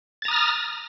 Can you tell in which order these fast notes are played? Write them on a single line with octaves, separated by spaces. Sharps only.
A6 A#5 D#6 F6